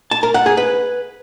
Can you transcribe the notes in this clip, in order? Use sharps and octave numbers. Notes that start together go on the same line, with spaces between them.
A5
A#4
F#5
G#4
B4